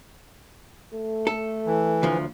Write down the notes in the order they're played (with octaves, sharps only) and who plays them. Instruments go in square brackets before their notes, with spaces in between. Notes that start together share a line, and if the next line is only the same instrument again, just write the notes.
[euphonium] A3
[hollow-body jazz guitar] A4
[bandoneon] E3
[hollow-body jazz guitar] D2 F3